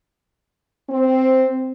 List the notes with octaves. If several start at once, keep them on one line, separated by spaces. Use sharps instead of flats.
C4